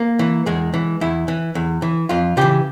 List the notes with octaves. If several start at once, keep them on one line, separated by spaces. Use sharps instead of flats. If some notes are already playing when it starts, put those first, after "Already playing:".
Already playing: A#3
E3
E2 G#3
E3
E2 E4
E3
E2
E3
F2 F4
C#3 E3 G4